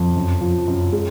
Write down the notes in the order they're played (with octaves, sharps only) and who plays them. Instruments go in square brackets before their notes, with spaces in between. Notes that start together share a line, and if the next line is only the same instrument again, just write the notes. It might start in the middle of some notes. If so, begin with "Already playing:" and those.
Already playing: [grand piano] F2
F#2
F3
F#2
G#3